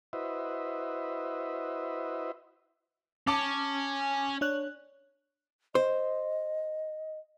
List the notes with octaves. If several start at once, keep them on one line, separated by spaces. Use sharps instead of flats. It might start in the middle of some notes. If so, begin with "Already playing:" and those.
E4 F#4 B4 C5 D#5 E5
C#4 A5 D6
D4 C#5 F#6
C5 D#5